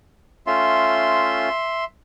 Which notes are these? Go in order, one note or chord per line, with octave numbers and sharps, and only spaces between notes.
A3 C#4 F4 E5 C6